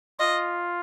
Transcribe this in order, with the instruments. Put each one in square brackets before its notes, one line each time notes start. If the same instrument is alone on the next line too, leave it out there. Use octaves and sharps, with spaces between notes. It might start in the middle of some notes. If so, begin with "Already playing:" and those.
[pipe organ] F4 [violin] D#5